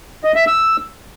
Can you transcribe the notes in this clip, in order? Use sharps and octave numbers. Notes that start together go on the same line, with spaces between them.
D#5
E5
E6